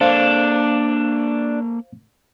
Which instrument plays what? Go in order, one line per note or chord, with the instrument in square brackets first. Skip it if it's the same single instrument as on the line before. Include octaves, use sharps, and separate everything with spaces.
[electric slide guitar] A#3 A4 [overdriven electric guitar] D4 [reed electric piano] C5 F5